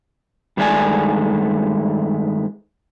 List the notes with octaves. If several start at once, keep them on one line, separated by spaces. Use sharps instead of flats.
G2 D#3 G#3 A3 D5 G#5